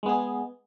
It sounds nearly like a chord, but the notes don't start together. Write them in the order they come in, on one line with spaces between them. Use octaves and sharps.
G#3 B3 G#4